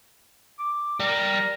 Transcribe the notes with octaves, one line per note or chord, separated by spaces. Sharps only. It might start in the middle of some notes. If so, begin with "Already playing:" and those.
D6
G3 A#4